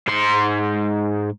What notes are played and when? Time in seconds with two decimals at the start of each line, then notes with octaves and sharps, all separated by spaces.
0.08 G#2 C6